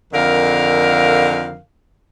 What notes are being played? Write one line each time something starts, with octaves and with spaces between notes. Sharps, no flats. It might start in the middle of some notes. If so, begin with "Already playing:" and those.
F2 D3 D#3 A#4 F5